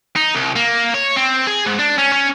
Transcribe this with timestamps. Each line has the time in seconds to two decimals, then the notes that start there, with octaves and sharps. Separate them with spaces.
0.16 D#4
0.35 C2
0.56 A#3
0.94 C#5
1.16 C4
1.47 G#4
1.66 G#2
1.79 D4
1.98 C#4
2.12 C#4